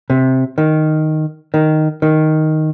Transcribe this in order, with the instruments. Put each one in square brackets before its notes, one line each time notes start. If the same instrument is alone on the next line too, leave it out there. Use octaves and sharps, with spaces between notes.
[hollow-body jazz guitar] C3
D#3
D#3
D#3